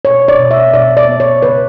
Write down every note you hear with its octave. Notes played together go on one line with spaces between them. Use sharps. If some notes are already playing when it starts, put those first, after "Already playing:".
B2 C#5
D5
B2
E5
B2 D5
D5
B3
C#5
C#3 B4